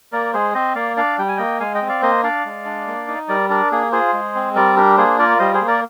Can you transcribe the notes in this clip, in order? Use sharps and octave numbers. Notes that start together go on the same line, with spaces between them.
A#3 A#4 D5
G#3 G#4 C5
C4 C5 D#5
A#3 D5 F5
D4 D5 F5
G3 G5
G#5
A#3 D#5 G5
G#3 F5 G#5
D#5 G5
C4
D5 F5
A#3 C5 D#5
D4 D5 F5
G#3
D4
A#3
D#4
G3 A#4 D5
D4 A#4 D5
A#3 G#4
F4 G#4 C5
G#3
C4
G3 A#4 D5
D4 G4 A#4
A#3 G#4 C5
F4 A#4 D5
G3 C5 D#5
G#4 C5
A#3
A#4 D5